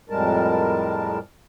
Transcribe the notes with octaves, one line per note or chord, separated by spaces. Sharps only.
F2 A2 G3 G#3 A#4 A5